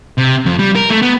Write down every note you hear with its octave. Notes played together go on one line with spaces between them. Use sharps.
C3
F2
G3
A#4
A3
B3